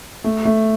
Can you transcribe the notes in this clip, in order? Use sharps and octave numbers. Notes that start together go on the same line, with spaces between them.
A3
A3